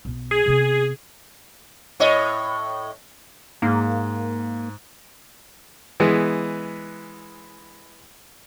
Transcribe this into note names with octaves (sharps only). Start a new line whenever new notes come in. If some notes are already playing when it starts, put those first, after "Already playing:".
B1 B3
G#4
C3 B3
A2 C#5 D#5
G#2 A#3
E3 G#3 B3